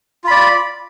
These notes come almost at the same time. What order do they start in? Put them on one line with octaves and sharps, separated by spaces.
F4 B5 D5